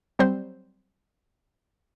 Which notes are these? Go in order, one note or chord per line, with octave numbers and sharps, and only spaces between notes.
F#3 G3 C4 C5